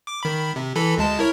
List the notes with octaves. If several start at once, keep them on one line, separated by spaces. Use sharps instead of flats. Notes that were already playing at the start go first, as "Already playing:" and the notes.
D6
D#3 B5
C3
E3 A4 B5
D2 G#3 A5
E4 A#4 C#5